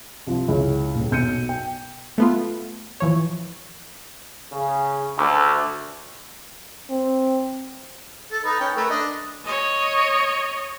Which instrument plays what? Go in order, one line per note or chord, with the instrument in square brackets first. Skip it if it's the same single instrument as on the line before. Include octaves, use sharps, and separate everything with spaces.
[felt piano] C2 F3
C#2 E4 C#5
D#1
B1 G6 C#7 D#7
G5
[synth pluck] A3 B3 F4
E3 F3 C#5
[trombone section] C#3
D2
[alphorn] C4
[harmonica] A4
D#4 B4
C#4 B4 G5
A3 A#4 B4
D4 D#5
[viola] C#5 D#5